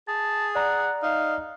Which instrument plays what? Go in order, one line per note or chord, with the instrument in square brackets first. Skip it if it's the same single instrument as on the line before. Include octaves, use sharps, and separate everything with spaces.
[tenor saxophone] G#4 [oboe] A5
[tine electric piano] D5 A#5 [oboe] F#5
[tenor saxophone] D#4 [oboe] F5